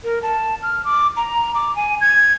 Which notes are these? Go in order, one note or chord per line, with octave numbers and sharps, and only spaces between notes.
A#4
A5
F6
D6
A#5
D6
G#5
G#6